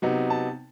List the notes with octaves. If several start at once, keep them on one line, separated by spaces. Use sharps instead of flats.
C3 F#3 B3 D#4
A5